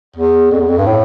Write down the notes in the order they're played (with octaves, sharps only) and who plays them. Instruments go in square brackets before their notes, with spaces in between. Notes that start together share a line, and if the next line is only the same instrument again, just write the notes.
[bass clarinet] E2
F2
E2
F2
G2
A2